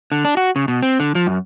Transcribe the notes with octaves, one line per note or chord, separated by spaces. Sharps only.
D3
D4
F#4
C#3
B2
C4
D3
F3
F#2